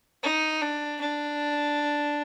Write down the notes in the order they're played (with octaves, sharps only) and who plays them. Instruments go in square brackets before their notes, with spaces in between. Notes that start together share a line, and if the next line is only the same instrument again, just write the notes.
[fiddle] D#4
D4
D4